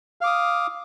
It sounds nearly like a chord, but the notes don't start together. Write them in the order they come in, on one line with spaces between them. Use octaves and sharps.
F5 D6 D#6